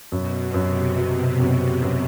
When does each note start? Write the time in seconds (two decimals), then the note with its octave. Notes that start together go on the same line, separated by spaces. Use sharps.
0.12 F#2 B2
0.54 F#2 C3
0.97 C3 F#3
1.40 F#2 C3
1.82 F#2